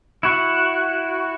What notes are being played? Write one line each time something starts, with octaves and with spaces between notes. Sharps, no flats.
E4 F#4